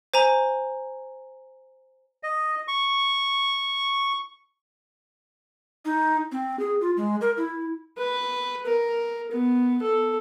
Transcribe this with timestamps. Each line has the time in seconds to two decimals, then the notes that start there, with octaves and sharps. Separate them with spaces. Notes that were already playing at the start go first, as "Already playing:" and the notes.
0.14 C5 G#5 A#5
2.23 D#5
2.68 C#6
5.85 D#4
6.32 C4
6.59 G#4
6.81 F4
6.97 G#3
7.21 A#4
7.37 E4
7.98 B4
8.66 A#4
9.31 B3
9.82 A4